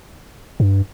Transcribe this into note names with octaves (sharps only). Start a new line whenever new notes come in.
G2